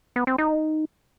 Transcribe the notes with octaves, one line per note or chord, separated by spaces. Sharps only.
B3
C4
D#4